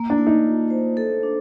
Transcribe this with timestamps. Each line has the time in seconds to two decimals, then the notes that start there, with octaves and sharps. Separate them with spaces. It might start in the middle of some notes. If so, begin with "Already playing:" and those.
Already playing: A#3
0.10 D4
0.18 A#3
0.27 D#4
0.45 F4
0.70 C5
0.97 A4
1.23 D4